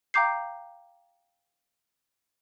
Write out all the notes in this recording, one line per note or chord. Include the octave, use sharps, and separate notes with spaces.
F5 G5 A#5 D6 G6 C7